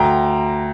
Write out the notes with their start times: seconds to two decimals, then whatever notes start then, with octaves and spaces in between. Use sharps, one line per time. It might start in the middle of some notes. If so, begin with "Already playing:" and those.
Already playing: D2 G5 A#5